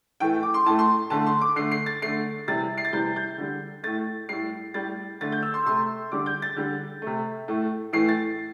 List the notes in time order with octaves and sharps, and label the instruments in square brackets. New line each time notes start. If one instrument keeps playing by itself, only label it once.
[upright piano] A2 E3 A3 G5
D6
C6
A2 A3 A5
C6
D3 A3 A5
C6
D6
D3 A3 C7
C7
A6
D3 A3 C7
C3 E3 G3 A6
C7
A6
C3 E3 G3 G6
G6
D3 G3
A2 A3 A6
A2 G3 C7
A2 G3 A6
D3 A3 A6
G6
E6
C6
C3 A3 C6
D3 G3 D6
G6
A6
D3 G3
C3 A3
A2 A3
A2 E3 A3 C7
A6